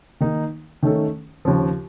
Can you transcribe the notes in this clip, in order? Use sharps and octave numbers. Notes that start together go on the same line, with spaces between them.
D#3 A#3 D#4
D#3 A3 C#4 A4
D#2 C#3 F3